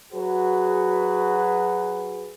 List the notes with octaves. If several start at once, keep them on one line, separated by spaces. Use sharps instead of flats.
F#3 F#4 G#4 B4